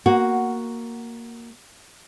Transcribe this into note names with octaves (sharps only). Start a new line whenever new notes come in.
A#3 F#4